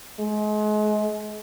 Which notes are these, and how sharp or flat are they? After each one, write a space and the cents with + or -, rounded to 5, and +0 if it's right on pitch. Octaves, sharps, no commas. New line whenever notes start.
G#3 +35